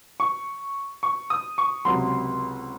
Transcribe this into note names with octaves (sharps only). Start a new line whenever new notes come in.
C#6
C#6
D#6
C#6
C#2 C3 F#3 C6